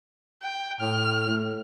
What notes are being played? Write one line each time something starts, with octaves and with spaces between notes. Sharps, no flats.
G5
A2 F6
A2